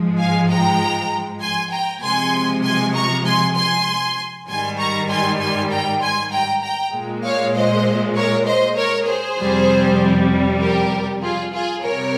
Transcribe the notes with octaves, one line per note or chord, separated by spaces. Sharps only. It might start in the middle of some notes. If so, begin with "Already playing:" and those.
Already playing: G#2 F3 G#3
F5 G#5
G5 A#5
G#5 C6
G5 A#5
C3 F3 G#3 G#5 C6
G#5 C6
A#5 C#6
G#5 C6
G#5 C6
G#2 D#3 G3 G#5 C6
A#5 C#6
G#5 C6
G#5 C6
G5 A#5
G#5 C6
G5 A#5
G5 A#5
A#2 G#3
C#5 F5
C5 D#5
A#4 C#5
C5 D#5
A#4 C#5
G#4 C5
F2 C3 G3
G4 A#4
F4 G#4
F4 G#4
C3 G3 A#4 C#5